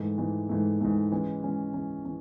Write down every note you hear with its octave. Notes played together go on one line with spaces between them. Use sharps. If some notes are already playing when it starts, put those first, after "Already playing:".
Already playing: G#2 E3 A3
G#2 E3 A3
G#2 E3 A3
G#2 E3 A3
E3 G#3 C#4
E3 G#3 C#4
E3 G#3 C#4
E3 C#4